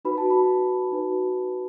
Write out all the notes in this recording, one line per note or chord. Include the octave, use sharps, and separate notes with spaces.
D#4 F#4 B4 B5
A5
B5
D#4 F#4 B4